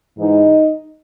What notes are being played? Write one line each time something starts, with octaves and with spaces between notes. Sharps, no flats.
G#2 E3 D#4